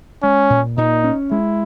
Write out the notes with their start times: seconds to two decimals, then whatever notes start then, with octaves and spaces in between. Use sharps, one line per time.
0.23 G#3 C#4
0.50 A#2
0.77 A#2 D#4
1.04 C#4
1.31 G#3 E4